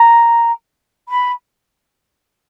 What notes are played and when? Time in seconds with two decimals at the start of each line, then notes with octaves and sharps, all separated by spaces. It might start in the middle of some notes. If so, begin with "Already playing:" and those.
Already playing: A#5
1.08 B5